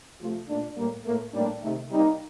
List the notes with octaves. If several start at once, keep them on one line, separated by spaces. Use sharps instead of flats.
C3 F3 A3 F4
A#2 A3 D4
A2 G3 A#3
A2 A3 A#3
A2 G3 A#3 D4
C3 D#3 A3
C3 G3 A#3 D#4